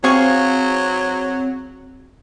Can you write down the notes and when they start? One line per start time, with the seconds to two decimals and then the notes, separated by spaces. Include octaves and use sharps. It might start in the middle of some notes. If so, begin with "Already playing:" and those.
0.04 F#3 C4 G#4 F5 C#6